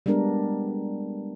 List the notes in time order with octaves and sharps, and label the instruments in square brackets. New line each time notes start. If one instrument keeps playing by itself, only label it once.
[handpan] G3 G#3 B3 D4 A#4